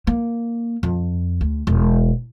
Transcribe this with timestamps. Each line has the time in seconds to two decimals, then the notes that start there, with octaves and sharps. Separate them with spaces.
0.07 A#3
0.83 F2
1.41 D2
1.67 E1